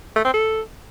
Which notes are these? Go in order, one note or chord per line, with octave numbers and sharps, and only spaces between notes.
A3
C4
A4